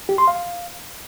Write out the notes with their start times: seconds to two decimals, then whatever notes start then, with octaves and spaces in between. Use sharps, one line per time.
0.09 G4
0.18 C6
0.28 F5